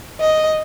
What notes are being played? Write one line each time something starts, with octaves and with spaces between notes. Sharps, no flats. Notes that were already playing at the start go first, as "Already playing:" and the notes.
D#5